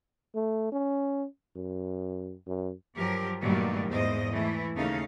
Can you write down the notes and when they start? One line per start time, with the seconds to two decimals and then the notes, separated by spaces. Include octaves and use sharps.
0.35 A3
0.72 C#4
1.56 F#2
2.47 F#2
2.96 G2 F3 F#3 G4 A#4
3.41 G2 A#2 D#3 F#3 G3 A3
3.89 E2 G#2 C5 D#5
4.31 E3 A3 E4
4.75 D#2 C#3 A3 C#4 D#4 F5